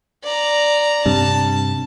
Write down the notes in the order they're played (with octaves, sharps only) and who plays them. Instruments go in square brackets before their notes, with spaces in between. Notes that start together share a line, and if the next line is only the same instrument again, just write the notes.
[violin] D5 A#5
[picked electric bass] G2 C3 [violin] A5